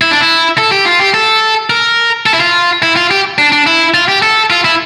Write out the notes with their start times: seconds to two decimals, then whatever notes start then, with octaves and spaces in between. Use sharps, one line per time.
0.02 E4
0.11 D4
0.21 E4
0.58 A4
0.72 G4
0.85 F4
0.99 G4
1.14 A4
1.70 A#4
2.26 A4
2.34 E4
2.40 F4
2.83 E4
2.96 F4
3.11 G4
3.38 D4
3.52 D4
3.67 E4
3.94 F4
4.08 G4
4.22 A4
4.50 F4
4.65 E4